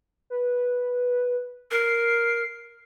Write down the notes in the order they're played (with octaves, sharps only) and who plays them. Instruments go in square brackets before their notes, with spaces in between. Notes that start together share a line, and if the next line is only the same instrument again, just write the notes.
[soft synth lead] B4
[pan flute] A#4 [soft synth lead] C7